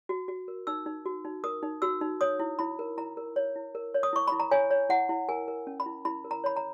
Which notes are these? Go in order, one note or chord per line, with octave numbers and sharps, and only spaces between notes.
F#4
F#4
A#4
D#4 E6
D#4
F#4
D#4
A#4 D#6
D#4
F#4 E6
D#4
C#5 D#6
E4
E4 B5
A#4
E4 A#5
A#4
C#5
E4
A#4
C#5
D#6
E4 C#6
E4 B5
A#5
C#5 G#5
C#5
E4 F#5
E4
A#4 G#5
A#4
C#4
B5
E4
E4 B5
A#4
A#5
C#5 B5
A#5